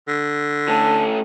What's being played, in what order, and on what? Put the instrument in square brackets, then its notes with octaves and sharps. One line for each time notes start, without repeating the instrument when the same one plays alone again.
[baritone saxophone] D3
[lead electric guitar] A3 C#4 [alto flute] A5